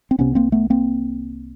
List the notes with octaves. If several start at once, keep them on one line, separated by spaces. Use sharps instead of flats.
C4
C2 C3 B3 C#4
A#3 C4
A3 B3
A#3 C4